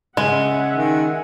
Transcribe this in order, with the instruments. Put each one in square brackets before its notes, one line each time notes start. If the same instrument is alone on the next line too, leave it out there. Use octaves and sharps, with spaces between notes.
[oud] C#3 [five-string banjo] G#3 [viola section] E5 F#5 G#5
[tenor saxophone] D#3